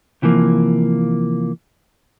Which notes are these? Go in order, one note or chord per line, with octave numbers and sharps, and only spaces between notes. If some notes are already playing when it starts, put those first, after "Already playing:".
C3 E3 F3 A#3